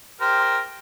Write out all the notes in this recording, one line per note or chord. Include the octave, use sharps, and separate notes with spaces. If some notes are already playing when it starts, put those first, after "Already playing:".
G4 A#4 C5